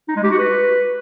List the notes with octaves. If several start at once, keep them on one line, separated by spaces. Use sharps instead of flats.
D#4
G#3
G4
F#4
B4